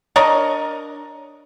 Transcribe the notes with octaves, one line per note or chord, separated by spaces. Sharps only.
D4 A#4 C#5 D#5